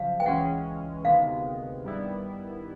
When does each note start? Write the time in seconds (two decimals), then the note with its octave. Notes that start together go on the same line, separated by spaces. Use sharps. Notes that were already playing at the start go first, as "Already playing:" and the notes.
Already playing: F#2 C#3 F3 F5
0.20 G5
0.26 C#2 C#3 E3 G#3 C#4 F#5
1.04 D2 C3 D#3 G#3 B3 F5
1.84 G2 D#3 G3 B3 E4